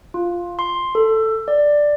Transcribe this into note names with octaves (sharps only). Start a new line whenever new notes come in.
F4
C6
A4
D5